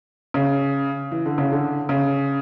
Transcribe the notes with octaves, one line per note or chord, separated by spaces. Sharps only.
C#3
E3
D3
C#3
D3
C#3